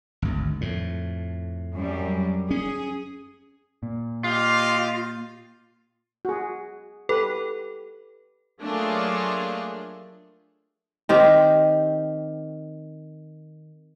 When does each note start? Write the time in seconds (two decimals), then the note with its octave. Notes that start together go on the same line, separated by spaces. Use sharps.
0.22 G#1 D2
0.61 F2 A2
1.77 F#2 G3
2.51 C#4 G#4
3.83 A#2
4.24 F4 G4 D#5 F5
6.25 F#4 G#4
7.09 G4 A4 B4
8.63 F#3 A3 A#3 D4 F4 G#4
11.09 D#3 C4 G4